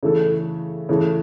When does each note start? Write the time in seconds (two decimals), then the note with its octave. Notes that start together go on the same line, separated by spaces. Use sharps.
0.03 C#3 E3 A3 E4 A4
0.89 C#3 E3 A3